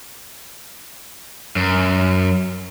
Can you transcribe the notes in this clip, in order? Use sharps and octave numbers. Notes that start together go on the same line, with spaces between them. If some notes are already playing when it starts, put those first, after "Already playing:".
F#2